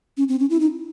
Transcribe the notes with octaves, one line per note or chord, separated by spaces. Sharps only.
C#4
C4
C#4
E4
D#4